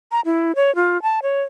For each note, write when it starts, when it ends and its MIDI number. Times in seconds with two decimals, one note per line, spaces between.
0.12 0.21 82
0.25 0.55 64
0.56 0.74 73
0.75 1.01 65
1.02 1.20 81
1.23 1.42 73